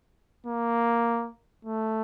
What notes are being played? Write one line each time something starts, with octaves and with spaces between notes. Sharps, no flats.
A#3
A3